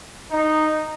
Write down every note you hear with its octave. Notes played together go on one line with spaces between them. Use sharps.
D#4